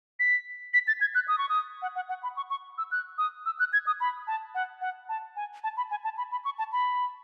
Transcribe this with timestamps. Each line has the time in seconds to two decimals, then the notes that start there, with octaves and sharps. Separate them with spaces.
0.20 B6
0.74 B6
0.88 A6
1.01 G#6
1.15 F#6
1.28 D#6
1.38 C#6
1.49 D#6
1.82 F#5
1.96 F#5
2.09 F#5
2.23 B5
2.37 C#6
2.50 C#6
2.78 E6
2.92 F#6
3.18 D#6
3.46 E6
3.59 F#6
3.73 G#6
3.87 D#6
4.00 B5
4.27 A5
4.55 F#5
4.81 F#5
5.09 A5
5.36 G#5
5.64 A5
5.77 B5
5.91 G#5
6.04 A5
6.18 B5
6.32 B5
6.45 C#6
6.58 A5
6.72 B5